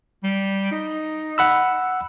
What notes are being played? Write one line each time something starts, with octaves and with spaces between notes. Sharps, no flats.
G3
D#4
F#5 B5 E6